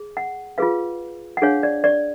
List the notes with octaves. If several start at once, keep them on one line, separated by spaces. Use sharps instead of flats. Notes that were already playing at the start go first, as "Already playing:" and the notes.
Already playing: G#4
F#5
F4 G#4 B4 F5
F#5
D4 G#4 C#5 F5
D5
D5